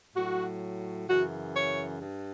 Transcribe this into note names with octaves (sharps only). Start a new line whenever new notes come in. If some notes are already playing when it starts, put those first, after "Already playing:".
A2 F#3 F#4
F#2 C#3 E3 F#4
C#5
G2